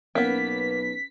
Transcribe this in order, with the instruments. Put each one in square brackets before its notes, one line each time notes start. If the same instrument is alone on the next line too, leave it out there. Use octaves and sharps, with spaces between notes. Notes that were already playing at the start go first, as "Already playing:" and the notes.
[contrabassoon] B1 [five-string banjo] A#3 B3 [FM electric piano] C#4 B4 [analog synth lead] B6